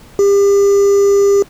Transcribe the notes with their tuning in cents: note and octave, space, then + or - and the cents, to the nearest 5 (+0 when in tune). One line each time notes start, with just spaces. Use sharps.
G4 +35